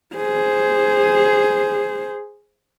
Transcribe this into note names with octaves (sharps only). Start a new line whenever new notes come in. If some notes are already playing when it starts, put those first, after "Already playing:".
G#4 C5